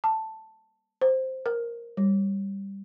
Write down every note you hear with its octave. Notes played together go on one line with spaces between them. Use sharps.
A5
C5
A#4
G3